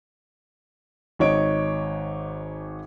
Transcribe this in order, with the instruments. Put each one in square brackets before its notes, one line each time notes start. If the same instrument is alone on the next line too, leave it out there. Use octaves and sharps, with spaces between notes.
[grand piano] G#1 D#4 C#5 D7